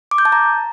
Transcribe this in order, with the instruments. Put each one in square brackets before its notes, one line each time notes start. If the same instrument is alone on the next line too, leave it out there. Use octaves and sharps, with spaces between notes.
[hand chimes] D6
G6
A5
A#5